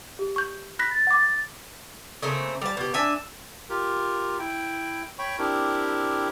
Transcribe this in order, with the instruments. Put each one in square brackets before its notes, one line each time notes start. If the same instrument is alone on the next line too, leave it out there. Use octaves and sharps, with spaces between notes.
[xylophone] G4
C#6 G6
[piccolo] B5 [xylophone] F#6 A#6 B6
[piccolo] A6
[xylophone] F#5 D6
[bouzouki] C#3 A3 A#3 C4
G3 A5
B2 G4
D4 E5 G#5
[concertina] F4 G4 A#4
E4 G5
C#5 G5 B5 C#6
C4 D4 E4 G4 A#4